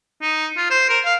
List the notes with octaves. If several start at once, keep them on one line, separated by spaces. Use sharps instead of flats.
D#4
F4
C5
A#4
F5